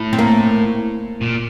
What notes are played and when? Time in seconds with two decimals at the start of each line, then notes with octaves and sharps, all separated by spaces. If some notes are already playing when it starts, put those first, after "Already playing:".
Already playing: A2
0.13 C4
0.19 A#3
1.21 A#2